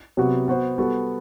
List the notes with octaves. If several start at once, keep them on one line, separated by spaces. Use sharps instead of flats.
C3 F#3 B3 F#4
B3 F#4 C5
G3 B3 F#4 A4